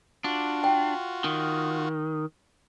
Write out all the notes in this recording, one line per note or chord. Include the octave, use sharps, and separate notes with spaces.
D4 F4 F#4
G5
D#3